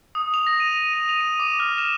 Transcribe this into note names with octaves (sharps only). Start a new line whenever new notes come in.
D#6
F7
A#6
D#7
F7
D#7
F7
D#7
D6
F6
E7